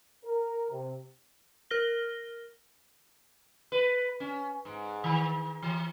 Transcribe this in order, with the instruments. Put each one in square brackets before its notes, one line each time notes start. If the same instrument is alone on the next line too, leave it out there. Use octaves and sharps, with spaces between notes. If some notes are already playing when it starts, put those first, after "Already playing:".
[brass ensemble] A#4
C3
[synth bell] A#4 F6 A#6 G7
[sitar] B4
C#4
G#2
D#3
E3